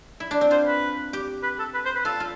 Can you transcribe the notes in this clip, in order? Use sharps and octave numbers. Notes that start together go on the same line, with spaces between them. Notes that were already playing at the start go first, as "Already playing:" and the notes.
E4
D4
C4
F4 C5
B4
G4
B4
A4
B4
C5
B4
F4 A4
F4